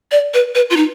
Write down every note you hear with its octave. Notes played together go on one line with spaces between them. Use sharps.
D5
B4
B4
F4
D#4